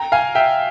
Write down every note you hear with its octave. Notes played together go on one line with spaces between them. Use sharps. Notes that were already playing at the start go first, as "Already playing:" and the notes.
Already playing: G5 A#5
F5 G#5
E5 G5